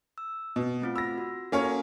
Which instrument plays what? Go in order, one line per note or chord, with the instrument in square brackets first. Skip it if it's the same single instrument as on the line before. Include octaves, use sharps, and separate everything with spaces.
[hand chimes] E6
[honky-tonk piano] B2 [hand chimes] D#5
[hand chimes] A3 C4 F4
[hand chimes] B5 [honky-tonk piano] E6 A#6
[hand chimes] F#4
[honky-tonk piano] A#3 C#4 C#5 [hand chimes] F#4 A4